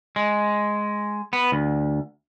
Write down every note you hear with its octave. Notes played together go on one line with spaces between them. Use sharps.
G#3
B3
D2